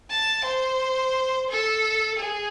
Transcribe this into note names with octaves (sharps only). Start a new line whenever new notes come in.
A5
C5
A4
G#4